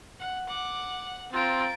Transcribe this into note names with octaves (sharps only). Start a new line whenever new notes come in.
F#5
F#5 D6
C4 F4 A#5 A6 D7